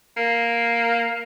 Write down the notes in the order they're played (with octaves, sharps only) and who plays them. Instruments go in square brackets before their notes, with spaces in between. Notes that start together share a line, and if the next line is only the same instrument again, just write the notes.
[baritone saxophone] A#3